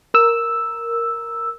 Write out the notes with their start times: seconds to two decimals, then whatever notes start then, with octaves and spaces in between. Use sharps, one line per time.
0.14 A#4 E6